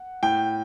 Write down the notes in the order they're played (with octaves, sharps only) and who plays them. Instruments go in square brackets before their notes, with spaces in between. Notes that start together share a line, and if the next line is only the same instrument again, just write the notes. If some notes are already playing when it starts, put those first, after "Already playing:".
Already playing: [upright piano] F#5
A2 G5